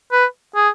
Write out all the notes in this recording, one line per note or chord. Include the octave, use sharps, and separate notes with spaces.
B4
G#4